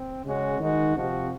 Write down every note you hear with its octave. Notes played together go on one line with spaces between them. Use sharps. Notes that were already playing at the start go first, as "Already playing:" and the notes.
Already playing: C4
C#3 G#3 C#4 F#4
D#3 G#3 D#4 F#4
C3 F3 C4 F#4